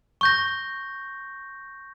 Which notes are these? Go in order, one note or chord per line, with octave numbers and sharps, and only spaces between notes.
C#6 G6 A#6